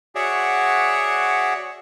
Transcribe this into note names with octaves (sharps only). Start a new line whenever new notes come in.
F#4 G#4 C#5 D5 E5 F#5